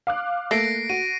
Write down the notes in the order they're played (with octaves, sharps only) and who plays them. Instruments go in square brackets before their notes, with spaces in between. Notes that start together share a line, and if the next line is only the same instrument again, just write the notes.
[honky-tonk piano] F5 D6 F#6
[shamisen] A3 [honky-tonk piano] A#3 [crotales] A#6 C7 D7
[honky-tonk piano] F#4 [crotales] D#7